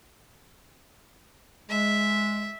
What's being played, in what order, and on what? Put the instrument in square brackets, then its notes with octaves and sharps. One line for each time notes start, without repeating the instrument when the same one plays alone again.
[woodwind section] G#3 [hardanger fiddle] E5